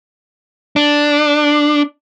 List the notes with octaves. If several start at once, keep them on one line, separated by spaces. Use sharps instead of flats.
D4